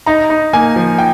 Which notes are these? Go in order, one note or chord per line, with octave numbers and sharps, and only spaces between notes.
D#4 A#5
D#4
A#3 G#5
F3
G5